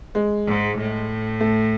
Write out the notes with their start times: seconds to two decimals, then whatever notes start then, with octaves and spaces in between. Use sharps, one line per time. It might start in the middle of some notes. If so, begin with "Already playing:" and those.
0.15 G#3
0.46 G#2
0.77 A2
1.40 A3